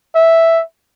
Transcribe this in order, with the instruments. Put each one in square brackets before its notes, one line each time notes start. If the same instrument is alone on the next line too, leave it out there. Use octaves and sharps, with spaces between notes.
[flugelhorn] E5